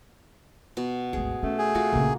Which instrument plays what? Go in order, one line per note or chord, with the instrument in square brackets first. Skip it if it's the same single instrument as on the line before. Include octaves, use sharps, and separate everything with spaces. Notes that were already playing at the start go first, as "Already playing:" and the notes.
[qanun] B2
[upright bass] G#1 D2 [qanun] G#4
[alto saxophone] A3 [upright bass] C#4
[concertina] G#4
[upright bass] C4 [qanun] F4 F#4
[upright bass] A#1 C#3 [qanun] A#3